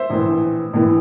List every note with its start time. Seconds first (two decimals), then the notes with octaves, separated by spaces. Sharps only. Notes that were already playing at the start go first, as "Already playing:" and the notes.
Already playing: C5 E5
0.10 A#1 A2 E3
0.73 A#1 A2 E3